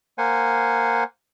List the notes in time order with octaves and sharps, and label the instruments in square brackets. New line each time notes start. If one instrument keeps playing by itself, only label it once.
[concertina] A#3 C5 F#5 G#5